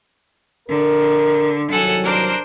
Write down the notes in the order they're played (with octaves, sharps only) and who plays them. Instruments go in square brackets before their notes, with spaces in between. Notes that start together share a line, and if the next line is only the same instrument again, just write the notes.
[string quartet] D3 [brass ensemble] A#4
[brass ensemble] C2 D#3 F#3 [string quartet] A4 F#5 G#5
[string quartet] D4 A#4 C5